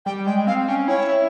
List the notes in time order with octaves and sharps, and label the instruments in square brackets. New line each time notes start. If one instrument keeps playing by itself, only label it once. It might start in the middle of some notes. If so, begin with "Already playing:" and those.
[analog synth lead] G3 [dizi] G5
[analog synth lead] G#3 [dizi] G5
[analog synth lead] C4 [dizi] F5
[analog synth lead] C#4 [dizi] G5
[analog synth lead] E4 [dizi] C#5
[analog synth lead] E4